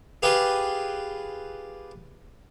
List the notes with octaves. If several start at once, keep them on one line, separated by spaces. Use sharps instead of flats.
F4 G4 G#4 B4 G5